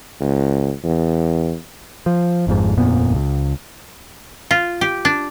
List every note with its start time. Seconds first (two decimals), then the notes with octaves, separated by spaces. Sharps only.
0.21 C#2
0.84 E2
2.06 F3
2.47 G#1 F2 G#2
2.77 G1 F2 A#2 B3
3.14 C#2
4.51 F4
4.81 G4
5.05 D4